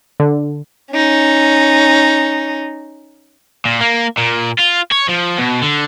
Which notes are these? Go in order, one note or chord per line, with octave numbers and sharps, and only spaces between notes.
D3
C#4 D#4
A#2
A#3
A#2
F4
C#5
F3
B2
D3